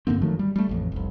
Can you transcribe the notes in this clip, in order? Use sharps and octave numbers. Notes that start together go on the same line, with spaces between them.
G2 D3 A#3 C4
D#3 F3 F#3 A3
G3
G3 A3
A1 F2
F1 C2